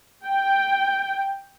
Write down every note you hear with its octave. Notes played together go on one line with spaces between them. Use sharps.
G5